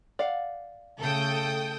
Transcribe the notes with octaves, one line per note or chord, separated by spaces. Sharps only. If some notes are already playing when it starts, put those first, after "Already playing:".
D5 F5 F#5
C#3 A3 A4 G5 D#6